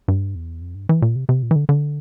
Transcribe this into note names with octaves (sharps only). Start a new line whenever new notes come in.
G2
E2
F2
G2
E3
A#2
C3
C3
A#2
E3
D3
D3